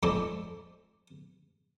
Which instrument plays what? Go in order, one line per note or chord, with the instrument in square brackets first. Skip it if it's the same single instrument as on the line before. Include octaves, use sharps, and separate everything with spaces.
[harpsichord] F2 G#2 G#3 A4 D5 D6